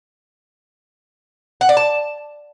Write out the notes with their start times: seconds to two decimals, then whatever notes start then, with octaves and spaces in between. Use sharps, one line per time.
1.61 F#5
1.69 D5
1.77 A5